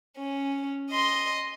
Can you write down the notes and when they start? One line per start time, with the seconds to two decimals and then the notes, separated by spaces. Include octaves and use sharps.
0.17 C#4
0.91 D#5 C6